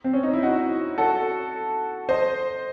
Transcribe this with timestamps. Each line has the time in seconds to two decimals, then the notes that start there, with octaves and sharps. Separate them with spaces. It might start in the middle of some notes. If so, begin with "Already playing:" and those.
0.04 C4
0.13 C#4
0.23 D#4
0.33 E4
0.43 D#4 F#4
0.98 F#4 A4
2.09 C5 D#5